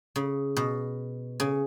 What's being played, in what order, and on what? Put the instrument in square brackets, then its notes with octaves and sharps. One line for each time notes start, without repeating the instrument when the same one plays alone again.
[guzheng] C#3
B2
C#3